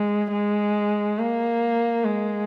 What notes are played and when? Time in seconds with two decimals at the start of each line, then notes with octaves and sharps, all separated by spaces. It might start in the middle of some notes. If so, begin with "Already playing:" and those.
Already playing: G#3
0.32 G#3
1.19 A#3
2.05 G#3